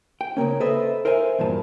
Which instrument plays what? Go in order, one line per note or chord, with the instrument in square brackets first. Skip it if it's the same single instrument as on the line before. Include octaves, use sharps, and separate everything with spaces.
[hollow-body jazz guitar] G5
C#3 F#3 A#3 C#4
A4 B4 C5 D#5 E5
A#4 C5 E5 F5 G#5
E2 G2 A#2 A5